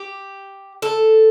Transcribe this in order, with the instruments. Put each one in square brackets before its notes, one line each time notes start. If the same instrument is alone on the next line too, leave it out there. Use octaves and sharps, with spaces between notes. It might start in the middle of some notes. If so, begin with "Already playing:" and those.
Already playing: [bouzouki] G4
A4